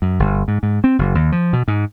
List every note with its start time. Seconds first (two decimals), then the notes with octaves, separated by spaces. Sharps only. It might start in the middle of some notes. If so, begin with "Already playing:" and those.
0.02 F#2
0.20 G1
0.48 G#2
0.63 G#2
0.84 C4
0.99 F#1
1.15 D#2
1.32 F3
1.53 B2
1.68 G#2